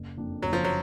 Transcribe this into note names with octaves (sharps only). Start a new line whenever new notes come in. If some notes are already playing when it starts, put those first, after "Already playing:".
Already playing: F#1
F2 F3 A#3 D4
F#1 F#3
F3
F#3